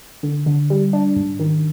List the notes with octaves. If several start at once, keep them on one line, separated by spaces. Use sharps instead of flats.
D3
D3
G3
D4
G#2
D#3